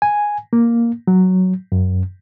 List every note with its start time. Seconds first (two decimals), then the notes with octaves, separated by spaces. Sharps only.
0.02 G#5
0.53 A#3
1.07 F#3
1.72 F#2